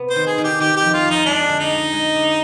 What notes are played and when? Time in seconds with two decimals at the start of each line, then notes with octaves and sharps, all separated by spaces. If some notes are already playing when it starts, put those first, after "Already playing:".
Already playing: C3 B3
0.10 C5
0.16 D#3
0.27 G#4
0.38 D#3
0.44 G4
0.60 D#3 G4
0.77 G4
0.82 F2
0.94 F4
1.05 F2
1.11 D#4
1.26 G#3 D4
1.49 D3
1.59 D#4
1.70 G#3
1.93 G#3
2.15 D3